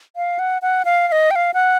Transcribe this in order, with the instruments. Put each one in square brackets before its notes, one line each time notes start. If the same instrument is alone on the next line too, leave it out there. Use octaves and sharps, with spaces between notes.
[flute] F5
F#5
F#5
F5
F5
D#5
G5
F5
F#5